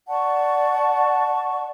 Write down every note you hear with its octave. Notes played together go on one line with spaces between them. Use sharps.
D5 F#5 A5 C#6